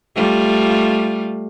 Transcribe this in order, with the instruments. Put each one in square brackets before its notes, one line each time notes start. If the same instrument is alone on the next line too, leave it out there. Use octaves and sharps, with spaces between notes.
[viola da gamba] G3 A3 F4